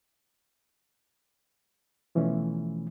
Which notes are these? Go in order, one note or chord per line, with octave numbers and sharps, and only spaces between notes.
B2 E3 F3 A3 C#4